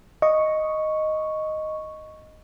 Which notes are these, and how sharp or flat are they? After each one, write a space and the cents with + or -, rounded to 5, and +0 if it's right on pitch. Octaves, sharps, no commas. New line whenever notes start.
D#5 +0 C#6 +0